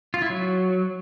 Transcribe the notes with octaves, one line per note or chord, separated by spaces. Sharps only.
F4
E4
F#3